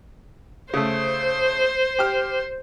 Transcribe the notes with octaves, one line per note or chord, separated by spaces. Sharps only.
C#3 A3 C5
G4 F6